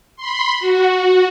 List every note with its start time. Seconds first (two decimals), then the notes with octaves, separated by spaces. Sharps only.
0.16 B5 C6
0.60 F#4